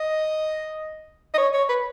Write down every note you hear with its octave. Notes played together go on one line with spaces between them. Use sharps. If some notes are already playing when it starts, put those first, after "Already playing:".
Already playing: D#5
D#5
C#5
C#5
B4